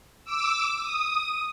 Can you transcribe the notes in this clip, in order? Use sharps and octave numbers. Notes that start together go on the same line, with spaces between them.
D6 E6
D#6